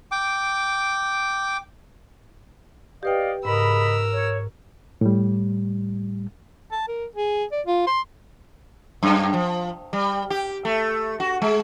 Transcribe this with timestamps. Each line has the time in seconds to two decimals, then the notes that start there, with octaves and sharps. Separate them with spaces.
0.12 G5 D6
3.03 G4 B4 D5 D#5 F5 G5
3.45 G#2 C#3 A#4 D#5 B5 E6
4.13 C#5
5.01 A2 G3
6.72 A5
6.88 A#4
7.16 G#4
7.52 D5
7.66 F4
7.87 C6
9.03 F#2
9.34 F3
9.93 G3
10.30 G4
10.65 A3
11.20 F#4
11.42 G#3